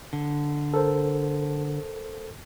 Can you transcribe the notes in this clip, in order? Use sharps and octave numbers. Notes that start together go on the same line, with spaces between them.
D3
A4 A#4 C5